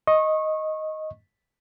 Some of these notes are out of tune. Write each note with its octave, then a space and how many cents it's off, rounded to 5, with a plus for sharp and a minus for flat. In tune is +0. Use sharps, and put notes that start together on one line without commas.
D#5 +5 C#6 -25